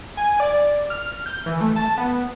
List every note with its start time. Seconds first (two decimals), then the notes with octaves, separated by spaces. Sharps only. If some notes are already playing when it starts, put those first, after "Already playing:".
0.17 G#5
0.40 D5
0.90 F6
1.26 G6
1.46 E3
1.61 A3
1.76 A5
1.98 B3